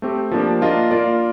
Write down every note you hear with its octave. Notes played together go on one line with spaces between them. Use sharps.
A3 C4 G4
F3 A#3 D4 G4
A#3 D4 F4 A#4 D#5
A#3 F4 A#4 D5